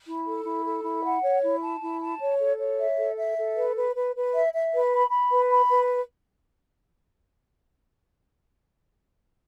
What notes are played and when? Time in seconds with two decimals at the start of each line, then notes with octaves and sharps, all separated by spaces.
0.06 E4
0.25 A4
0.45 E4
0.65 A4
0.83 E4
1.03 F#5
1.22 C#5
1.43 E4
1.62 A5
1.81 E4
2.00 A5
2.20 C#5
2.39 A4
2.58 C#5
2.78 E5
2.97 A4
3.17 E5
3.37 A4
3.55 B4
3.75 B4
3.94 B4
4.15 B4
4.34 E5
4.53 E5
4.72 B4
4.92 B5
5.11 B5
5.31 B4
5.50 B5
5.70 B4